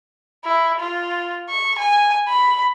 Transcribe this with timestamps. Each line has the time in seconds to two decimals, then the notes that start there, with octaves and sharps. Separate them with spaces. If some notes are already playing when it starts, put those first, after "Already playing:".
0.44 E4
0.80 F4
1.49 C#6
1.78 G#5
2.28 B5